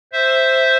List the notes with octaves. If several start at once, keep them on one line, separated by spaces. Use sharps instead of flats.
C5 E5